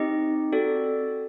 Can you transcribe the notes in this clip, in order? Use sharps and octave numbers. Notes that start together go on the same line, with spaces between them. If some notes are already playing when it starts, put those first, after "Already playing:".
Already playing: C4 D#4 G4 D#5
C4 F#4 A4 D5